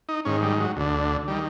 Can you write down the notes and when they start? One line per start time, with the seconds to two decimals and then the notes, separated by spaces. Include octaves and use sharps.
0.09 D#4
0.25 G#2 D#3 C#4
0.42 G3
0.60 F#3
0.76 D2 D3
1.27 D#3 G3